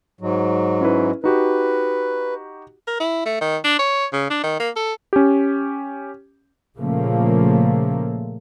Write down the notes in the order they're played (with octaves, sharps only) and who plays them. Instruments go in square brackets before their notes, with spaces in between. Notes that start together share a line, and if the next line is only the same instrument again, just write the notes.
[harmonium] G#2 F#3
[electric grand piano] C#4 E4 B4
[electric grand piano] D#4 F#4 G4 [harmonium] B4
[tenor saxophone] A#4
E4
A3
D#3
D4
C#5
C#3
D4
D#3
A#3
A4
[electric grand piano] C#4 G4
[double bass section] A#2 C#3 F3 A3 A#3